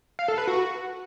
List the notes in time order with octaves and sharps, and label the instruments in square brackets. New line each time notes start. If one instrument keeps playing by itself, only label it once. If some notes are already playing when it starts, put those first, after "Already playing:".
[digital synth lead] F5
A4
B4
F#4